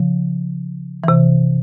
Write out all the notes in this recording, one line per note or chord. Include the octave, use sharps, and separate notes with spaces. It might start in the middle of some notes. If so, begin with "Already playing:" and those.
Already playing: C#3 F3
C3 E3